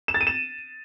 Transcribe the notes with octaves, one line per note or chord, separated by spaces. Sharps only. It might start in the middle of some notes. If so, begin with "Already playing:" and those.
E7
A6
D#7
E7